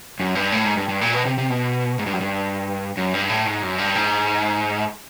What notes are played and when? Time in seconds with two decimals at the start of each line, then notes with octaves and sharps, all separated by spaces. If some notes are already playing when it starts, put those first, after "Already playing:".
0.20 F#2
0.35 G2
0.52 A2
0.64 G#2
0.77 G2
0.89 G2
1.01 A#2
1.14 B2
1.25 C3
1.38 C3
1.50 B2
1.99 G#2
2.06 G2
2.13 F#2
2.21 G2
2.97 F#2
3.14 G2
3.29 A2
3.46 G#2
3.62 F#2
3.78 G2
3.95 G#2